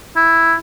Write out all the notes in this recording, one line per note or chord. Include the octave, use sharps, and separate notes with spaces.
E4